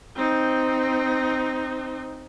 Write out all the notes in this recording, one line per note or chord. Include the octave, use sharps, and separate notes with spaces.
C4 D#4